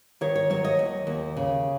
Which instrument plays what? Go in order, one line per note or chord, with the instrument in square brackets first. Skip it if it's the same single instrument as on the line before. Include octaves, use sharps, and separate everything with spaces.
[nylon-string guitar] D#3 C#5
C#5
F#3 C#5
D#5
D#2
D#2
C#3